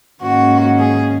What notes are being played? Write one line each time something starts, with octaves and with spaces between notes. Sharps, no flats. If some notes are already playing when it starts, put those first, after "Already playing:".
G#2 D#3 A#3 C#4 F#4
G#4